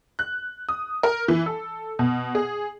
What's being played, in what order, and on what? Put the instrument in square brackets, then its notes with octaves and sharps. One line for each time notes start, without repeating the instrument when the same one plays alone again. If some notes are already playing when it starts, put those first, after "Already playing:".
[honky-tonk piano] F#6
D#6
A#4
E3
A4
B2
G#4